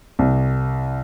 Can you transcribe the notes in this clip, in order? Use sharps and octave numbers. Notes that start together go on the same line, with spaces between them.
C2